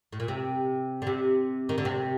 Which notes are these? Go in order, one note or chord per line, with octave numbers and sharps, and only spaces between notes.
A2
A#2
C3
D3
C3
D#3
D3
C3